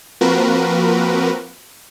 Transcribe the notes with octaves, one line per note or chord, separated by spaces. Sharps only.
F3 A#3 C4 F#4 A#4 B4